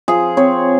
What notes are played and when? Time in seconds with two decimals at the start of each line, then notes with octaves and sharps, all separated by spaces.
0.08 F3 G#4
0.37 C4 C#5